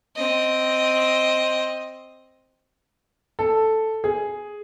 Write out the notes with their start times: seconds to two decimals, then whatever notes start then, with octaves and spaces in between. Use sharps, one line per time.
0.16 C4 D#5
3.39 A4
4.04 G#4